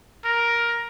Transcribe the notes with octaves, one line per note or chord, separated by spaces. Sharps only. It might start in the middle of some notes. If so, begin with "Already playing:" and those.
A#4